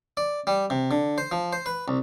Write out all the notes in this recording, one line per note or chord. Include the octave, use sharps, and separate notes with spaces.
D5
G3
C3
D3
C5
F3
C5
B4
C2